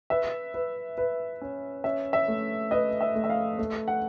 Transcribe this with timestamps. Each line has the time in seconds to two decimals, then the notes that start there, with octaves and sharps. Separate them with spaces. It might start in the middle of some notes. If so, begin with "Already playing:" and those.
0.10 B4 E5
0.54 B4
0.98 B4
1.41 C#4
1.84 C#4 E5
2.13 E5
2.28 A3
2.71 B4 D#5
3.01 E5
3.15 A3
3.24 E5
3.30 F5
3.58 A3
3.88 F#5